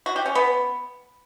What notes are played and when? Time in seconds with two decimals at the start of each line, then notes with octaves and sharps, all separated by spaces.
0.06 F#4
0.16 G4
0.26 C#4
0.35 B3